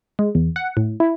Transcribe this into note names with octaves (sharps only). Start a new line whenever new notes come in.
G#3
E2
F#5
A2
E4